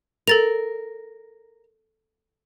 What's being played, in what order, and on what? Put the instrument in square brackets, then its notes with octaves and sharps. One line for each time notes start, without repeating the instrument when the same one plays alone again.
[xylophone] A4 A6 F7 [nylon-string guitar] A#4